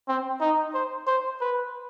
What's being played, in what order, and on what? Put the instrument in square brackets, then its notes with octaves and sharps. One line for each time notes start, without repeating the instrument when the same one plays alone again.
[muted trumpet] C4
D#4
C5
C5
B4